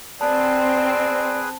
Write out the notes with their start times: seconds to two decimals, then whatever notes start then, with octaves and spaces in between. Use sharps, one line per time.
0.21 C4 G#4 B4 D5 A5